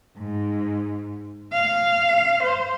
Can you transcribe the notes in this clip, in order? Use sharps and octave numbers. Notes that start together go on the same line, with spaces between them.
G#2
F5
C5